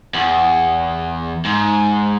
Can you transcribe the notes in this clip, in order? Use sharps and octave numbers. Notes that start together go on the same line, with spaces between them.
E2
G#2